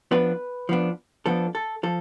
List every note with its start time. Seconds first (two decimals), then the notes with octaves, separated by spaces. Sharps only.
0.11 F3 B3 D4 B4
0.69 F3 B3 D4
1.26 F3 B3 D4 A4
1.55 A4
1.83 F3 A4